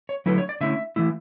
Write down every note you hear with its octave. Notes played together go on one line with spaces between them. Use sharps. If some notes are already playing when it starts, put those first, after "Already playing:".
C#5
D3 F#3 A3 E4 B4
C#5
D5
D3 A3 C#4 E4 E5
E3 A3 E4